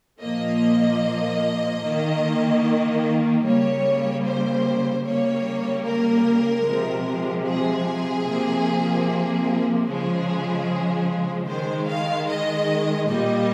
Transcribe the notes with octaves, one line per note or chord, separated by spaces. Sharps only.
A#2 F3 A#3 D#5
D#3 A#3
C#3 G3 A#3 C#5
C5
C#3 G3 A#3 C#5
A#4
C3 F3 G#3
G#4
C3 F3 A#3
C#3 F3 G#3 G#4
D#3 G#3 C5
F5
D#5
A#2 G3 A#3 D#5